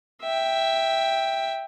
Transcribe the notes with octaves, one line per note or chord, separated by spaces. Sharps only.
E5 G5